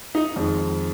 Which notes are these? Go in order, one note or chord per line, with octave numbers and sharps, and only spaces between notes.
D#4
F2 D#3 G#3